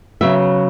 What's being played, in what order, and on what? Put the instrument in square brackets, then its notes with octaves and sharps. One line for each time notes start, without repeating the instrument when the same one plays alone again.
[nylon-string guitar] C#3 F#3 B3 E5